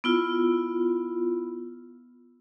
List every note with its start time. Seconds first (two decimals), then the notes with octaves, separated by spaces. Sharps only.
0.04 B3 E4 F4